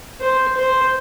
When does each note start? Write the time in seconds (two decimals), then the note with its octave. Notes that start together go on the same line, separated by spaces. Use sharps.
0.21 C5
0.57 C5